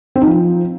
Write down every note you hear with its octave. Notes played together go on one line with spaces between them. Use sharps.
C4
D#4
F3